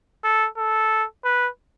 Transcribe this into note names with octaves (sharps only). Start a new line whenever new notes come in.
A4
A4
B4